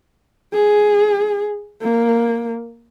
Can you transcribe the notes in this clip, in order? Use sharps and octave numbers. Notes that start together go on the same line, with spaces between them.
G#4
A#3